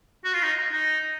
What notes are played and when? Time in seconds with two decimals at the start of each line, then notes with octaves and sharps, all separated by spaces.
0.24 F#4
0.33 F4
0.43 D#4
0.72 D#4